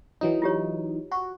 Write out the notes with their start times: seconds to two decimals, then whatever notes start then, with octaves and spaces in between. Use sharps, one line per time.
0.21 E3 F#3 D#4
0.42 F4 G4 C#5
1.12 F#4 C#6